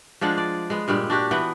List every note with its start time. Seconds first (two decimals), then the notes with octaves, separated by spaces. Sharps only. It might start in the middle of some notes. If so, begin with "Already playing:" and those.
0.21 F3 G#3 D4 F#5
0.37 D5
0.70 G#3 B3
0.88 G2 A#2 G3 G#3
1.10 D4 F#4 G4
1.31 E3 B3 F#5 G5